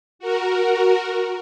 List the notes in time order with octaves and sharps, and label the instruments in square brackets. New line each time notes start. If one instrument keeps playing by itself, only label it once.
[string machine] F#4 A#4